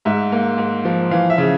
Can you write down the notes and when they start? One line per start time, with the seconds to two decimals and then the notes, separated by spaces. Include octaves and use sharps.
0.05 G#2 E5
0.32 A#3
0.58 G#2
0.85 F3
1.11 E3 F5
1.30 E5
1.38 C#3